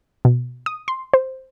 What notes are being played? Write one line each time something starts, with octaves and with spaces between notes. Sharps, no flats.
B2
D#6
C6
C5